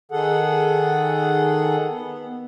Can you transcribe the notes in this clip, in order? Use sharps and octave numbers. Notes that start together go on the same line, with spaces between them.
D#3 G#4 A4 F#5
B3